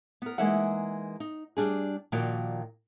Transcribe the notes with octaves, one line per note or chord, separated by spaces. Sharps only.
B3 A#4
E3 G#3 A#3 D#4 E5 F#5
D#4
G3 D4 G#4
A#2 D#3 F3 F#4 D5 G5